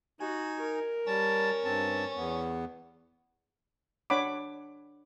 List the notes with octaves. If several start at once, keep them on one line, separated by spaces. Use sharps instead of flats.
D#4 F#4 G#5
A#4
G3 C#4 A5
G2 C4 A5
E2 B3
D4 C#5 F#5 B5 D6